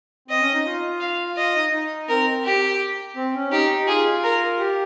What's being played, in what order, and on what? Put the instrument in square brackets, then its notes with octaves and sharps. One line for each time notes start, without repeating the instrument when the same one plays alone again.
[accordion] C4 [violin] D#5
[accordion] C#4
D#4
F4
[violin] F5
[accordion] F4 [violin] D#5
[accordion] D#4
D#4
[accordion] C4 [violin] A#4
[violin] G4
[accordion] C4
C#4
[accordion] D#4 [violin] G4
[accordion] G4
[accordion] F4 [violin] G#4
[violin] A#4
[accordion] G4